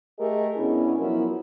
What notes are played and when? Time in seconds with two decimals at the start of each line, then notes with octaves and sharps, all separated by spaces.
0.19 A3 G4 G#4 A#4 D#5
0.57 B2 B3 C#4 D4 E4
0.99 F3 F#3 B3 E4 A#4